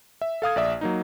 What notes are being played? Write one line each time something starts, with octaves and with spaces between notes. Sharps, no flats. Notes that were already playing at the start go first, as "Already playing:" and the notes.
E5
A4 F5 D#6 G#6
A#1 D5 E5 D#6
F#3 A#3 D#4